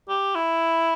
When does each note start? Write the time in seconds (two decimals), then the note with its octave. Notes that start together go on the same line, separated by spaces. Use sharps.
0.08 G4
0.35 E4